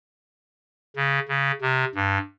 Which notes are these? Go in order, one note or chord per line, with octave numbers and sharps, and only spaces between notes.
C#3
C#3
C3
G2